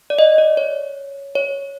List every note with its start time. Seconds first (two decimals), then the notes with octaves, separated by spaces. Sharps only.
0.10 D5
0.19 D#5
0.38 D5
0.57 C#5
1.35 C#5